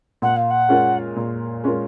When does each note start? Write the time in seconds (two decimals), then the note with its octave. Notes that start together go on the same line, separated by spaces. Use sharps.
0.22 A#2 F#5
0.36 F5
0.50 F#5
0.69 G#3 C#4 F4 A#4
1.16 A#2
1.64 G#3 C#4 F4 A#4